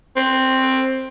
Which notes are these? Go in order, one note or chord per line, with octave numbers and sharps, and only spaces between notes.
C4